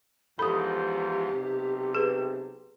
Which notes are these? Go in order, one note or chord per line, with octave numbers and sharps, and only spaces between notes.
E2 G#2 F3 G4 A4 B5 D#6
B1 C3
G#4 B4